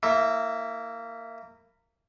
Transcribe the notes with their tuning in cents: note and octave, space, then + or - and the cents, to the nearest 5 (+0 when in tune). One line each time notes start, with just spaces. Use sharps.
A#3 -20 E4 +0